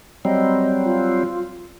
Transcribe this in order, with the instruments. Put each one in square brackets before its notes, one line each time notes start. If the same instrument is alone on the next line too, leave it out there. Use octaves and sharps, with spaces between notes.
[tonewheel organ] F#3 G3 C4 [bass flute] D#5
[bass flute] F4